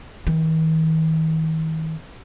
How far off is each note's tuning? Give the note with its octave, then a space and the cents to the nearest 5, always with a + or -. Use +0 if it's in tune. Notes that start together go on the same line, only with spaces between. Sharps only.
D#3 +45